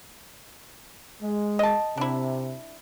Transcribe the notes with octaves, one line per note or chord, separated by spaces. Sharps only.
G#3
D#5 A5
C3 D4 E4